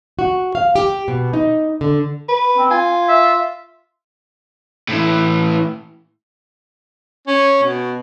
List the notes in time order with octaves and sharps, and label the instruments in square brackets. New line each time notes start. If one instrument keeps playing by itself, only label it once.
[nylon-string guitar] F#4
F5
G4
B2
D#4
D3
[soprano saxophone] B4
[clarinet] C4
[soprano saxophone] F4 [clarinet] G#5
[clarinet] E5
[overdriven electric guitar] A2 E3
[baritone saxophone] C#4
B2